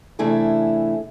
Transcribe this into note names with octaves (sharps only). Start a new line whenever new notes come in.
C3 E3 A3 D4 E4 G#4